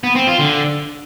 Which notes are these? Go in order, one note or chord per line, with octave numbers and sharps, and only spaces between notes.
B3
C4
F4
D3